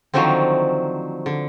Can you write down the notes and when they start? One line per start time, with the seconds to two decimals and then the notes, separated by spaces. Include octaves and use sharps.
0.14 D3 D#3 F3 F#3 A3 C4
1.26 D3